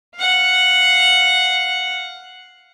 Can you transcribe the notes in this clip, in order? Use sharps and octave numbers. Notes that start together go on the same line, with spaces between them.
F5 F#5